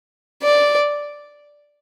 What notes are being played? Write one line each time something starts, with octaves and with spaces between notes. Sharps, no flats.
D5